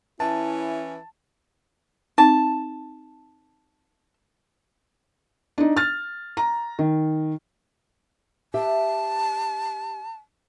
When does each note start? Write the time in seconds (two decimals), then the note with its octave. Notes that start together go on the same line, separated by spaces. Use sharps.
0.20 E3 C#4 E4 A5
2.18 C4 D#4 A5
5.58 D4 D#4
5.77 F6 A6
6.37 A#5
6.79 D#3
8.54 G4 E5 A5